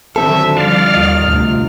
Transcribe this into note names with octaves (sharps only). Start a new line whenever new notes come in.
D3 D#3 F#3 C4 A4 E5
F3 G3 D5 F5 F6
D#2 F4 D#5
D2 C3